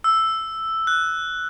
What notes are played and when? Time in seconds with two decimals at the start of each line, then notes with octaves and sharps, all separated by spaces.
0.04 E6
0.87 F#6